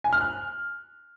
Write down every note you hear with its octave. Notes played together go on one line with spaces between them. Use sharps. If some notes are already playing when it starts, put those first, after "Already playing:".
G#5
F6
F#6